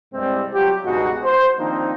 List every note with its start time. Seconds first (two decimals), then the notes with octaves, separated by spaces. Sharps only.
0.14 C2 G2 C3 G3 G#3 C4
0.54 F#3 F4 G4
0.84 C#2 G2 B2 D#4 F#4 G#4
1.24 C5
1.58 D#3 F3 A#3 C4 D4 D#4